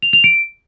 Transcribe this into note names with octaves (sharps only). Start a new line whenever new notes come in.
F7
F7
D7